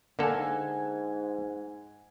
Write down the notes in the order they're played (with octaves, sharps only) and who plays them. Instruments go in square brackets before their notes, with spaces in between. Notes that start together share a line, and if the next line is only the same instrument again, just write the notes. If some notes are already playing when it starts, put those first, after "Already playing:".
[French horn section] G#2 [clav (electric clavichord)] D3 A#3 A4 [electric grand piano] F#5 G#5